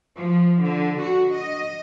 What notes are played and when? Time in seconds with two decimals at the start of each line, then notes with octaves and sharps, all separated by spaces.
0.18 F3
0.63 D3
1.01 F#4
1.33 D#5